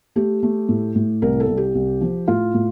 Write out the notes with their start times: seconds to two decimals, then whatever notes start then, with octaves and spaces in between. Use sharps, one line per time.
0.16 A3 G4
0.43 A3
0.68 A2
0.95 A2
1.22 C2 A#4
1.40 A4
1.48 C2
1.57 G4
1.75 C2
2.01 F3
2.28 A2 F4
2.54 A2